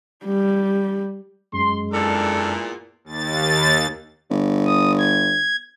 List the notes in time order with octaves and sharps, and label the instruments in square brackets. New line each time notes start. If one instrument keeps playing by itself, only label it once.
[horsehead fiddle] G3
[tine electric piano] F#2 [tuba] G#3 [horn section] C6
[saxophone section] E2 A#2 [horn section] D4 A4
[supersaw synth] D#2 A6
[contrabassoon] G1
[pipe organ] D#6
G#6